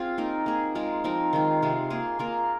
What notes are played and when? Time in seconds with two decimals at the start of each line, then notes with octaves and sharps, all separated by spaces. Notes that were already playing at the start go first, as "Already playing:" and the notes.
Already playing: C4 F4 G#4
0.18 A#3 D#4 A#4
0.46 A#3 G#4
0.75 G#3 F4 A#4
1.04 F3 C4 D#4 A#4
1.33 D#3 G#3 F4
1.62 C3 G#3 F4
1.90 A#3 F4 G#4
2.19 A#3 F4 A#4